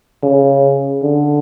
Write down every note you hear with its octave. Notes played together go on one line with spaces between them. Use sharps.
C#3
D3